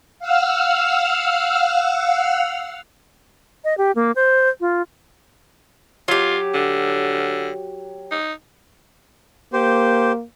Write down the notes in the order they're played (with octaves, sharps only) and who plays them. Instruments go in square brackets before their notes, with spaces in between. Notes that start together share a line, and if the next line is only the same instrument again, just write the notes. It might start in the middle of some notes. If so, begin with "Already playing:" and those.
[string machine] F5 F#5 E6 F6
[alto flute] D#5
G4
A#3
C5
F4
[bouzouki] F#3 G4 [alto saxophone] F4
[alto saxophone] D3
D#4
[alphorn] A#3 [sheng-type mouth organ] G4 C5